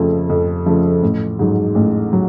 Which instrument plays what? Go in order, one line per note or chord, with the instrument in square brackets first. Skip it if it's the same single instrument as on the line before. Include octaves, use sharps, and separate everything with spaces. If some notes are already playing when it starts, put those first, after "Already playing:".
Already playing: [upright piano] F2 C#3 F3 A3
F2
C#3 F3 A3
A1
G#2 F#3
A1
F#3